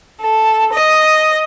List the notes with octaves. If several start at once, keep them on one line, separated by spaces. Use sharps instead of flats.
A4
D#5